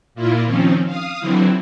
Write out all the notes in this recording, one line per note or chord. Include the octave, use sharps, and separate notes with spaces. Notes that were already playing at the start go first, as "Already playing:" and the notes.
A#2 A#3 E4 F4
D#3 F3 C4 C#4
F5 D#6
D3 E3 F#3 C4 E4